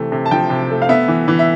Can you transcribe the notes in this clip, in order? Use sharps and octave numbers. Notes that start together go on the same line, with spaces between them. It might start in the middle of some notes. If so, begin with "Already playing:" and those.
Already playing: C3 E3 A3
C3
A5
F3 G5
C3
A3
F5
B3 E5
E3
E3
E5